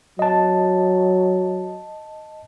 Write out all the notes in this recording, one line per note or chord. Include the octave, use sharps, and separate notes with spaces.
F#3 D#5 A5